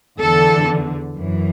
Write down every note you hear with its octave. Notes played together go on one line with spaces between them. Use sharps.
E2 D3 A4
F#2 E3